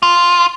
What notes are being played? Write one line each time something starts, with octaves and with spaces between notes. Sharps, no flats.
F4